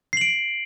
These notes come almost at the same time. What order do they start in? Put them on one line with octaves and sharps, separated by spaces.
C7 F#7 D7